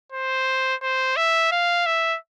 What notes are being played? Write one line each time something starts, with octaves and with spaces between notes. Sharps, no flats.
C5
C5
E5
F5
E5